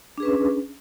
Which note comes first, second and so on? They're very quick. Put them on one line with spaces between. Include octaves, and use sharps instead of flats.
D4 G#4 B4 C#4